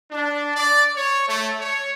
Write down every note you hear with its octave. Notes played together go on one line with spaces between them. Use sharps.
D4
D5
C#5
A3
C#5